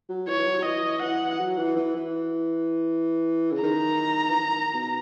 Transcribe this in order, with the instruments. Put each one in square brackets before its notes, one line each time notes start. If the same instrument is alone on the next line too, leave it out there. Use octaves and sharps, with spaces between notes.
[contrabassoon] F#3
[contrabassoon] E3 [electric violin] C#5
[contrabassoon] E3
F#3
F#3
[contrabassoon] E3 [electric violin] D#5
[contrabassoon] E3 [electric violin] F#5
[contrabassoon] F#3
E3
E3
E3
C#3
[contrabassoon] D#3 [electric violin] A#5
[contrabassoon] E3
D#3
B2